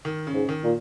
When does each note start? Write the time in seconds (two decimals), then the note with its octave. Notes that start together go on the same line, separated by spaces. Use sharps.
0.05 D#3
0.27 C#3
0.34 G#2
0.49 D#3
0.64 A#2